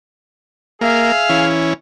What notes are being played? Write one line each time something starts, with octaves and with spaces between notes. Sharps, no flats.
A#3 G#4 E5 F5
E3 C#4